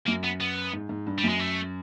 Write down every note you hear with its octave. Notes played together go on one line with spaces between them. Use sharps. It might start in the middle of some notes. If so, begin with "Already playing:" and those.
F#2 A#3
B3
B3
G#2
G#2
G2
G3
F#2
G#3
A3